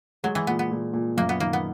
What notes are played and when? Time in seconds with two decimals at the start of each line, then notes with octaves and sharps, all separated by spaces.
0.24 F#3 G#3
0.35 E3
0.47 A#2 B3
0.59 B3
0.71 A#2
0.94 A#2
1.17 F#2 A#3
1.29 B3
1.40 D#3 A#3
1.53 B3